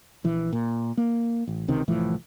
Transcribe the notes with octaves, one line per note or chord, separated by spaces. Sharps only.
A#1 E3
A#2
A#3
A1
C#2 C3 D#3
C2 A2 E3 F3